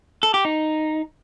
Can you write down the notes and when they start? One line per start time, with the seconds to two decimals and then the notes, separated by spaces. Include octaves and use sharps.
0.23 A4
0.34 G4
0.45 D#4